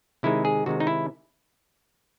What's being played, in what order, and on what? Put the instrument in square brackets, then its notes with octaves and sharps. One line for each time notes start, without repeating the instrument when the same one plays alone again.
[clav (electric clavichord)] C3 D#3 G#3 D#4 E4
G#4
C3 D#3 G#3 D#4 F#4
D#4
E4